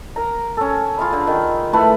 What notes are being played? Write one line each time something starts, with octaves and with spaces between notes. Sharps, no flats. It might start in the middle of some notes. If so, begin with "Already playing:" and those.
A#4 A#5
C#4 A4
F4 G#4 F5 B5
D3
D#3
A3 E4 A4 B4